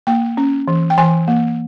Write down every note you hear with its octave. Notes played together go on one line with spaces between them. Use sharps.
A#3 G5
C#4
E3
G5
E3 G#5
A#3